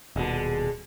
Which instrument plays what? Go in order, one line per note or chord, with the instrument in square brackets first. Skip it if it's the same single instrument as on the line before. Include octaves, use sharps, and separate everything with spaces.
[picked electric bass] D#1 B2 [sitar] D3 G#3